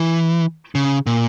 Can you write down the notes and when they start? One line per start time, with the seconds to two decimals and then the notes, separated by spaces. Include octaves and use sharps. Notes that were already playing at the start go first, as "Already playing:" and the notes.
Already playing: E3
0.75 C#3
1.06 A#2